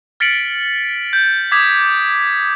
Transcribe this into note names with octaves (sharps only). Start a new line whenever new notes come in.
F6 A6 B6 C#7 D7 F#7
G6
D6 D#6 G#6 B6